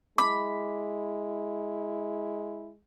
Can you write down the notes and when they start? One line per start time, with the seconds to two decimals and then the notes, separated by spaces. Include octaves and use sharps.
0.18 G#3 E4 B5 D6